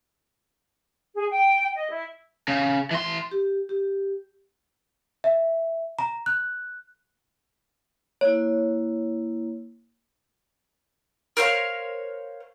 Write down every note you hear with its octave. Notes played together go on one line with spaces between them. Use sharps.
G#4
G5
D#5
E4
C#3
E3 C6
G4
G4
E5
A#5
F#6
A#3 E4 C#5
A#4 C5 C#5 F5